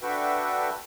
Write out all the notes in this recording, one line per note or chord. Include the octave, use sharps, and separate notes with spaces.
D4 F#4 A4 B4 E5 G5